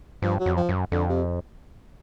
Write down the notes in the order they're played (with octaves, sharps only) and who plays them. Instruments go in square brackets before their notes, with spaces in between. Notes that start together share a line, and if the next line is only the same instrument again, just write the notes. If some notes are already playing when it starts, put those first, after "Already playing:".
[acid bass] G2 [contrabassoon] F3
[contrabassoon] F#3
[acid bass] F2
[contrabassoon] F3
[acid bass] F#2
[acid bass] F2 [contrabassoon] D3
[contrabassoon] C3